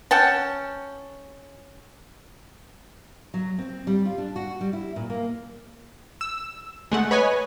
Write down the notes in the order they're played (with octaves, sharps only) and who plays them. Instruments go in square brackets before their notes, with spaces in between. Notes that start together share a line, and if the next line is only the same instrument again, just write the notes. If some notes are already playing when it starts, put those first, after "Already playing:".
[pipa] C#4 F#5 G5 A5
[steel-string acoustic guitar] F#3
C4
G3
F4
D4
F#4
G3
E4
A#2
A#3
[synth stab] E6
G#3 A3 F#5
B4 C#5 D#5 G#5